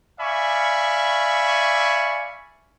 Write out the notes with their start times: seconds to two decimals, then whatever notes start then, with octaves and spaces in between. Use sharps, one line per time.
0.20 D5 E5 F5 G#5 B5 C#6